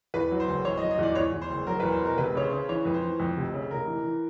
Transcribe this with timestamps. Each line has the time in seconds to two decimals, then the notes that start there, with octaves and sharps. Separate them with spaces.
0.14 E2 B4
0.31 F#3
0.40 C5
0.48 F#1
0.65 E2 C#5
0.77 D#5
0.82 F#3
0.91 D#5
0.99 E2 D5
1.15 E2 C#5
1.32 E2
1.42 C5
1.50 F#1
1.67 F#3 A#4
1.80 B4
1.83 E2
1.92 C5
2.00 B2 A#4
2.18 F1 B4
2.35 C#3 C#5
2.43 C5
2.51 C#3
2.69 E3 C#5
2.85 F2 B4
2.94 C5
3.03 E3
3.20 F2
3.37 F1
3.54 C#3
3.71 F1 A#4
3.87 E3
4.04 E3